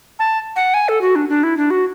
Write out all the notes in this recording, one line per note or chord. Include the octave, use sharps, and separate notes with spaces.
A5
F#5
G#5
A4
F#4
D4
D4
E4
D4
F#4